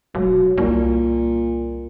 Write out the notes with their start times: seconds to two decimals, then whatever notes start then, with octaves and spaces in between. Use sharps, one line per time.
0.15 E1 F#3
0.58 C2 A#2